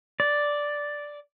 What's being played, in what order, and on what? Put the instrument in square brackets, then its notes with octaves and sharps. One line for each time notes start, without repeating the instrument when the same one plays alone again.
[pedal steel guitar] D5